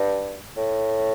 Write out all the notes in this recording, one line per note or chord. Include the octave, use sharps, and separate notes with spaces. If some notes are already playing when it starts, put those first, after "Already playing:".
Already playing: G2
A2